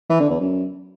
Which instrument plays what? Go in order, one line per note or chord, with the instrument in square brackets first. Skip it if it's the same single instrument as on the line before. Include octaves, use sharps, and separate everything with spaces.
[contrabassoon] E3
D3
E2
F#2